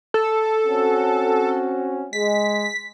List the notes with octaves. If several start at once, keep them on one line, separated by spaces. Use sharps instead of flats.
A4
C4 C#4 F#4
G#3 B6